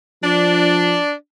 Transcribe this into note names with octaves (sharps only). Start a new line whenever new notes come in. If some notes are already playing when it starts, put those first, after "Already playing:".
F3 D4